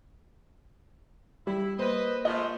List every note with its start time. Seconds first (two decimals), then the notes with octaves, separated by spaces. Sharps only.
1.47 G3 E4
1.79 A#3 B4 C5 D#5
2.25 F3 G#3 A3 D#5